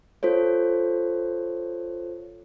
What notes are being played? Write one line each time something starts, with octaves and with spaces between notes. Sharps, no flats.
F4 A4 C5 C#5